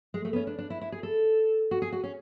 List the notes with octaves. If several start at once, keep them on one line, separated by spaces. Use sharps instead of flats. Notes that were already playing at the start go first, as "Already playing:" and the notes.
G#3
A3
B3
C#4
D4
D4
E4
E4
G#4
A4
F#4
G#4
F#4
C#4